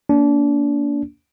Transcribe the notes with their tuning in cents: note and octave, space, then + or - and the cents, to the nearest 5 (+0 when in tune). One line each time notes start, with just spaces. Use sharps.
A#3 +0 D4 -30